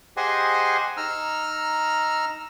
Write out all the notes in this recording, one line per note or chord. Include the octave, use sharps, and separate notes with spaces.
G4 G#4 C5 D#5 F#5 G#5
D#4 A#5 E6 F6